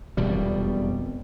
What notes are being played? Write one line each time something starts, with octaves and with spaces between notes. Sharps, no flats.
E1 F2 B2 G3